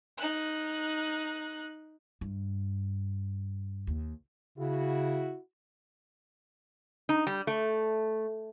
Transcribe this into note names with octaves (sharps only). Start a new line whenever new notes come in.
D#4 F#6
G2
D#2
C#3 E4 F#4
D#4
G3
A3